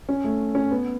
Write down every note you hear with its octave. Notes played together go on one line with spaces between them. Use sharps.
C#4
A3
C#4
B3